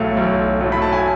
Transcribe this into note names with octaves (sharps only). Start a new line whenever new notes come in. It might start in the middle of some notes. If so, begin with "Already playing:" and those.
Already playing: B1 A2 F#3 A3 F5
B1
A2 F#3 A3
B5
A5
G#5